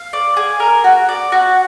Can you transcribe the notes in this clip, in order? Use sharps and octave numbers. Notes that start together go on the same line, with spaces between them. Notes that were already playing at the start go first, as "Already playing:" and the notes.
Already playing: F5
D5
G#4
A#4
F#4
D5
F#4